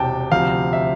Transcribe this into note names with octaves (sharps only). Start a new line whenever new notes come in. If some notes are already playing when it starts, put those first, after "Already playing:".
Already playing: E1 E2 C3 G5 A5
D2 C3 F3 F5
E5